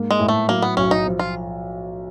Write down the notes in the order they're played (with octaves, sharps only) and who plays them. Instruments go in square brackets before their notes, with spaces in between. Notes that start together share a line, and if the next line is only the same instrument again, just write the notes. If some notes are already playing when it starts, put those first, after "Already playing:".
Already playing: [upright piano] G#2 A#3
[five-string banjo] G#3
[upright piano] A2
[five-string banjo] A3
[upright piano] F#3 [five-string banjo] A#3
[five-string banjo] B3
[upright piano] B1 [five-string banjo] C#4
[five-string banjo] D#4
[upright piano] F3
[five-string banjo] F4